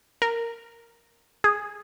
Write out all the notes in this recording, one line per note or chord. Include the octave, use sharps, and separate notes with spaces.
A#4
G#4